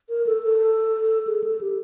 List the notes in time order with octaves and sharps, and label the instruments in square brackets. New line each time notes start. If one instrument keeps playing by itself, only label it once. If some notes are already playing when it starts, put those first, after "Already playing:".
[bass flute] A#4
A4
A4
G#4
A4
G4